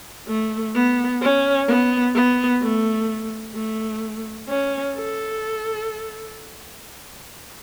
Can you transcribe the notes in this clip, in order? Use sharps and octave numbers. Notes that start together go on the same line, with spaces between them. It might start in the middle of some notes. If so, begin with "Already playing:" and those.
A3
B3
C#4
B3
B3
A3
A3
C#4
A4